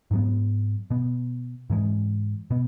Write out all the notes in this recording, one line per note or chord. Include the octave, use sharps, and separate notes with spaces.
G#2 F#3 B3
B2 B3
G#2 E3 G#3
B2 B3